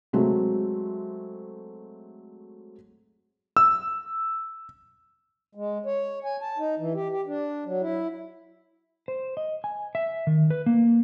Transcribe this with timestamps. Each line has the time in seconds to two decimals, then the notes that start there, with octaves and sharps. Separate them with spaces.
0.13 F#3 G#3 A3 C4
3.57 E6
5.55 G#3
5.86 C#5
6.24 G#5
6.41 A5
6.58 D#4
6.79 E3
6.94 G4
7.11 G4
7.27 D4
7.66 F#3
7.81 E4
9.08 C5
9.37 D#5
9.64 G#5
9.95 E5
10.27 D#3
10.50 B4
10.66 A#3